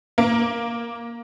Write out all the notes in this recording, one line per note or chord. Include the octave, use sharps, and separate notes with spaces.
A#3